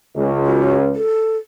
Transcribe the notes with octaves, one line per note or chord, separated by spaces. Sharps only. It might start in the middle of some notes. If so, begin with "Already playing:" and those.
C#2
F#4
A4